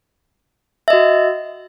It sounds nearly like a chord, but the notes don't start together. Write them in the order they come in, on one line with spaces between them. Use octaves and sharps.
E5 D#5 F#4